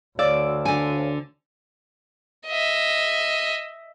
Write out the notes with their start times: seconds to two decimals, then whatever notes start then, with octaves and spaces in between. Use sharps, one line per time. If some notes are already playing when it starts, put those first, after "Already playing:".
0.19 D2 C#5 D5 F5 E6
0.65 D3 G#5
2.47 D#5 E5